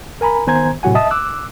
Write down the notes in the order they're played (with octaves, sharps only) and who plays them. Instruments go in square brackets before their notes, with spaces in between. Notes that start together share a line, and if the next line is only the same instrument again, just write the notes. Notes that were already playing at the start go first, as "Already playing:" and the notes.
[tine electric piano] A#4 G#5 A#5 B5
D#3 B3 C5 G#5 A#5 G#6
A2 C3 F#3 F#4 F#5 G#5
D#5 E5 A5 D#6
D6 E6 F#6